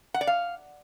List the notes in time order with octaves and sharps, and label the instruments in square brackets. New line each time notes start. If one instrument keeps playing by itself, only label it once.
[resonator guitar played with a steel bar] F#5
D5
F5